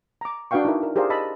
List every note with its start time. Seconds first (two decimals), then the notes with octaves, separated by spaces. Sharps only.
0.21 A#5 D6
0.51 D4 F#4 B4 F5 G5 C#6
0.65 D#4 E4 A#4
0.83 A#4
0.96 G4 G#4 A#4 C5 D5 F5
1.10 D#5 A5 B5 E6